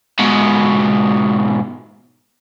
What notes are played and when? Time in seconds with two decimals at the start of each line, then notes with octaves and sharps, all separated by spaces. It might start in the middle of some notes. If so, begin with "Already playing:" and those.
0.19 G#2 B2